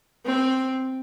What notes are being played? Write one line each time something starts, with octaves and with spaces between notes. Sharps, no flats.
C4